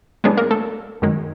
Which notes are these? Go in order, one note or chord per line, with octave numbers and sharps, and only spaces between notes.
A2 F#3 G#3 B3 D4 G#4
A#3 A#4
A3 A4
F#2 D#3 G#3